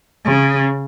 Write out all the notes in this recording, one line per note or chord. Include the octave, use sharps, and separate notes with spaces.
C#3